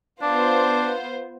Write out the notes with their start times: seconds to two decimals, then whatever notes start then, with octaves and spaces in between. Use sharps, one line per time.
0.22 B3 D4 F4 C5